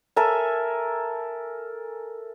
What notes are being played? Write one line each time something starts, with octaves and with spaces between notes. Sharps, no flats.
A4 A#4 E5 G#5